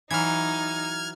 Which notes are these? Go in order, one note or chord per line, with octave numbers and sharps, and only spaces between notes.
E3 F#3 D#4 F6 G#6